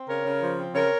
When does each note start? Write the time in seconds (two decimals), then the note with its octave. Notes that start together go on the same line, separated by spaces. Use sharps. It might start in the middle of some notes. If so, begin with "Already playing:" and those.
Already playing: C4
0.09 C#3 A#4 C#5
0.25 C#3
0.42 F3
0.59 C4
0.75 C#3 A#4 C#5